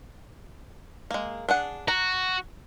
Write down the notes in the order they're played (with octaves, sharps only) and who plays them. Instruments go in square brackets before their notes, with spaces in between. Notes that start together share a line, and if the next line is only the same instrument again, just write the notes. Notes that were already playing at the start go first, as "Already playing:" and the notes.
[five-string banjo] G#3 A#3
D4 G#4 F#5
[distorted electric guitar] F#4 [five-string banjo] A#5